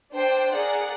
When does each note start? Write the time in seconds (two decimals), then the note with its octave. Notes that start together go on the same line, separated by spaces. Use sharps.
0.13 D4 C5 G5
0.52 G#4 A#4 D5 F#5